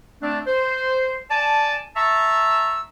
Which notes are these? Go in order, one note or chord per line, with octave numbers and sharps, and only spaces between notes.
A3 C4 D4
C5
D5 G#5 A5
E5 A5 A#5 C#6 E6